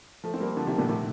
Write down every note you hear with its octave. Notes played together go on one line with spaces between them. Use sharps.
F3 A3
C4
G3 A#3
D3 F3
C3 D#3
A#2 D3
A2 C3